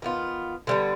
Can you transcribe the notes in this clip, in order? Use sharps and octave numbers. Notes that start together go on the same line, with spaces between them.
D#3 B3 F4
D3 G3 B3